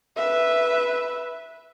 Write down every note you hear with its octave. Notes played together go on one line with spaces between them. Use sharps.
B4 E5